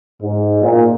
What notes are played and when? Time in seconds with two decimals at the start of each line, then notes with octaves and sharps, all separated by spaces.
0.23 G#2
0.63 A#2